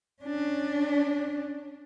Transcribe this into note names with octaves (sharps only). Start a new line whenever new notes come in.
C#4 D4